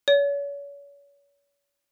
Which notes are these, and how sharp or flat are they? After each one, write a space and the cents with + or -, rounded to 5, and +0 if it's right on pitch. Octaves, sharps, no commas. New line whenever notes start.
C#5 +35